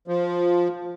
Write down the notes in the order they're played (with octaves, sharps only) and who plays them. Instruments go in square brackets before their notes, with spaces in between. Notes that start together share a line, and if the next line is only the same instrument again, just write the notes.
[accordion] F3